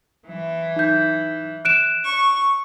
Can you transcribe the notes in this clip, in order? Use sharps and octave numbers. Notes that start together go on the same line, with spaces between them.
E3
D#4 G6
F#6 D7 E7
C#6